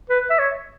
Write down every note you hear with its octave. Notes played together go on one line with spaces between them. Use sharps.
B4
E5
C#5